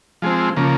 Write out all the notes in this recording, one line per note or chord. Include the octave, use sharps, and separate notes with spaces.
F3 G#3 C4
C#3 F3 A#3